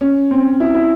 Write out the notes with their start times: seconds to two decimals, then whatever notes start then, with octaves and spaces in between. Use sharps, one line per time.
0.01 C#4
0.31 C4
0.60 E4
0.74 E4